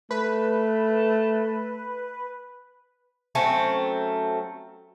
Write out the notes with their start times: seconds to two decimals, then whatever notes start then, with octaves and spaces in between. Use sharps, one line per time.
0.11 A3 B4
3.35 F#3 A3 C4 C#4